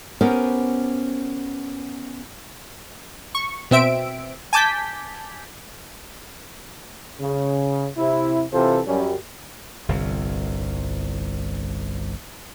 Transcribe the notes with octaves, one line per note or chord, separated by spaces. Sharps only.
B3 C#4 G4 A#4 C5
C#6
B2 C4 E5 D7
G#5 A5 D6 G6 B6
C#3
C3 E4
C3 E3 C4 F4 A4 C5
F#2 G3 C#4
G1 C2